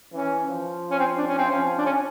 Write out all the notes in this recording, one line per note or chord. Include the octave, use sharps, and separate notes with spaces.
E3 C#4
F3
C#4
C4
D4
C#4
C4
F3 C#4
D4
C#4